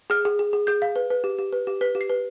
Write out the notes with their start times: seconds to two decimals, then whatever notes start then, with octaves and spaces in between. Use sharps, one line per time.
0.10 G#4 F6
0.25 G#4
0.39 G#4
0.53 G#4
0.67 G#4 G6
0.82 F5
0.96 B4
1.10 B4
1.24 G4
1.39 G4
1.53 B4
1.67 G4
1.81 B4 B6
1.95 G4
2.01 C7
2.10 B4